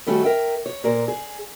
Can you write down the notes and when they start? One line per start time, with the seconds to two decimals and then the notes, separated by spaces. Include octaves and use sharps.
0.07 D#3 G3 A3 C#4 F#4 A4
0.24 A#4 E5 G5
0.66 C#5
0.84 A#2 A#4 C5
1.08 G#4